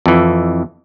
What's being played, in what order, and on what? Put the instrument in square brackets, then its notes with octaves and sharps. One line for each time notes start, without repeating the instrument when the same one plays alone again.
[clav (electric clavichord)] F2 E3